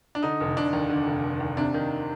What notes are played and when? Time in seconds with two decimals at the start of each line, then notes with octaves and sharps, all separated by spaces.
0.15 D4
0.22 D3 D#4
0.40 F1
0.56 F1 D4
0.73 D#2
0.89 D3
1.06 F1
1.23 F1
1.40 D#2
1.57 C3 D4
1.74 D#3